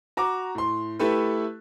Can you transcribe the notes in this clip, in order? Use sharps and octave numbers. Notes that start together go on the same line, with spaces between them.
F#4 A#5 D6
A2 C6
A3 E4 G4 A4 B4